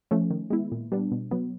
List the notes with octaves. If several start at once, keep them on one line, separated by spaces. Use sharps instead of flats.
F3 A3 C#4
D#3
G#3 B3 E4
A#2
G3 B3 D4
B2
F#3 B3